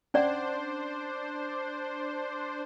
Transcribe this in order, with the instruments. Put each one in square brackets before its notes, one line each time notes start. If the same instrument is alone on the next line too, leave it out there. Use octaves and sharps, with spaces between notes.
[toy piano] C#4 D5 F#5 [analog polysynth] D4 C5